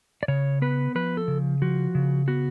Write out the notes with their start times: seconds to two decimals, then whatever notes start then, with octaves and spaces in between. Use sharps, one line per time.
0.23 D5
0.28 C#3 C#5
0.62 B3 B4
0.95 F3 B4
1.17 A4
1.28 C#3
1.62 F3 F#4
1.95 C#3
2.28 B3 F#4